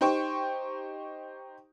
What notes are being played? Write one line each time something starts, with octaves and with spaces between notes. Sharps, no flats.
D#4 G4 C5 G5 C#6